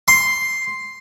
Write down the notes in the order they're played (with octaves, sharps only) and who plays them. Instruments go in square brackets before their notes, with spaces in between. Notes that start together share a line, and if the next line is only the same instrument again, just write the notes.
[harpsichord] C6